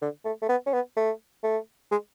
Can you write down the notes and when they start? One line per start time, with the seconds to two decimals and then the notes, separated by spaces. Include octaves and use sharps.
0.02 D3
0.25 A3
0.42 A3
0.49 B3
0.66 C#4
0.73 B3
0.96 A3
1.43 A3
1.91 G#3